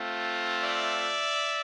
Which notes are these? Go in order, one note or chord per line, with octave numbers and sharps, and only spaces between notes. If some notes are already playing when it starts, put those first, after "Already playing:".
Already playing: A3 C4 F4
D5 E5